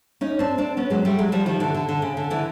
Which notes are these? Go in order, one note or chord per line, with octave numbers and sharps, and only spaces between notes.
C#4 D#4
C4 D4
C4 D4
B3 C#4
F#3 G#3
G3 A3
F#3 G#3
F3 G3
D#3 F3
D3 E3
D3
D3
C#3
D3
D3 E3